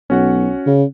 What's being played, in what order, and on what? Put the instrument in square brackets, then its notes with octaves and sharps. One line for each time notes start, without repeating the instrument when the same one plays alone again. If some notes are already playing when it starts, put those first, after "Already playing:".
[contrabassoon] B1 [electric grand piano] C#4 F#4 F#5
[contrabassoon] C#3